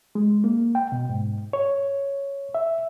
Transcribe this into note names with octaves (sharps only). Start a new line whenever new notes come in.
G#3
A#3
G5
B2
G#2
C#5
E5